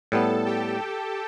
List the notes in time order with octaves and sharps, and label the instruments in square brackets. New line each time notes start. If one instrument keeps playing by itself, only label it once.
[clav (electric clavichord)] A2 G3 B3 [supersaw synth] A4 A5
[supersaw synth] G4 G5